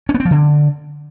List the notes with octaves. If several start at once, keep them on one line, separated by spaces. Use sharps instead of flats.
C#4
B3
C4
F3
D3